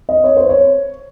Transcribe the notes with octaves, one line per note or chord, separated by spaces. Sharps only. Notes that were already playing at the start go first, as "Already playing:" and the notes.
D#5
C#5
C5
C#5